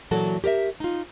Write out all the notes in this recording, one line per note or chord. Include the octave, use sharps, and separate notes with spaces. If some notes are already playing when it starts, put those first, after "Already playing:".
A#2 E3 F#3 F#4 A4
G4 A#4 D5 E5
D#4 F4